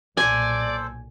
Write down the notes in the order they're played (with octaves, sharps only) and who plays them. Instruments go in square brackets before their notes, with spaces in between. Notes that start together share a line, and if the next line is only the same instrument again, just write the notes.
[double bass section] B1 A#2 [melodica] A4 C5 [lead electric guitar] D5 [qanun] G#5